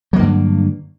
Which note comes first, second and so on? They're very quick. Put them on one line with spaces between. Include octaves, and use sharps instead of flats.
F#3 A#3 D3 G2